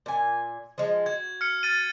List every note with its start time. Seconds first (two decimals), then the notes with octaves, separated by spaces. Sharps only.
0.06 A#2 G#5
0.78 F3 G#3
1.06 F#4 G#6
1.41 F6 C#7
1.63 F6 A6 D#7